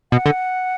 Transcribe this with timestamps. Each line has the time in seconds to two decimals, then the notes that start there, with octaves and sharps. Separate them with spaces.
0.12 B2 F#5
0.26 D3